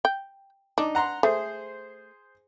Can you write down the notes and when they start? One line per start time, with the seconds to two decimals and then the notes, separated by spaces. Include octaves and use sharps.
0.05 G5
0.78 D4 D#4
0.95 F#5 A#5 C6
1.23 A3 G#4 C5